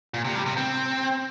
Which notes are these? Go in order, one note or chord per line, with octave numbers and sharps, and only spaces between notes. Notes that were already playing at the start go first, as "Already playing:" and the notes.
A#2
C3
G3
C3
C4